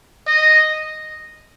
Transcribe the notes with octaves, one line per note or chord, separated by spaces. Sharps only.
D#5